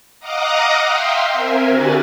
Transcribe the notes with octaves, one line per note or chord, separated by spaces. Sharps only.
D#5 F5 F#5 A#5 D6 D#6
E5 F5 G5 C6
C4 A#4 E5 G#5
D3 F#4 G4 F#5 G#5 A6